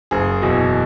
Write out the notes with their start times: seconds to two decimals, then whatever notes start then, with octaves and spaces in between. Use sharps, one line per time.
0.11 F#1 G#4
0.42 E2 B2